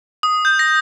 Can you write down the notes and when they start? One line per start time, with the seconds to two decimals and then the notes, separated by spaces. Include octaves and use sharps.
0.23 D#6
0.45 G6
0.59 A#6